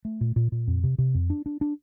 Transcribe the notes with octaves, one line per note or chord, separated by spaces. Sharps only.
A3
A#2
A#2
A#2
F2
C3
C3
F2
D4
D4
D4